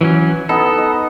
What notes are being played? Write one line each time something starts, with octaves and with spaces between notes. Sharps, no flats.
E3 F#3 C#4
B3 D#4 A4
D#5